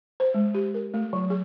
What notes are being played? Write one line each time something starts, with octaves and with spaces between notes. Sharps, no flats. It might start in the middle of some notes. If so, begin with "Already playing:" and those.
C5
G#3
G4
A#4
A3
F#3
G#4